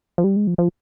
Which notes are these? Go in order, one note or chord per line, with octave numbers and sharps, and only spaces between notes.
F3
G3
G#3
F3
F3